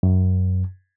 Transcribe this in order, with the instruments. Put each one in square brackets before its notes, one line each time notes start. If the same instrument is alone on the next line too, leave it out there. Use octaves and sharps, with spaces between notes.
[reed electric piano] F#2